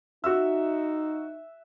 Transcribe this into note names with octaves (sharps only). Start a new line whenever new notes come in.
D#4 F#4 E5 E6